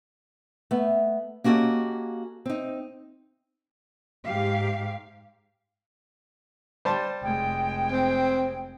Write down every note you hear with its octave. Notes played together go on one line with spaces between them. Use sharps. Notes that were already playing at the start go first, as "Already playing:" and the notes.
A3 B3
A#3 C#4 F#4 G4 A4 D#5
C4 D#4
G#2 G4 F5
G3 C5 A5
F1 G#3 G5
C4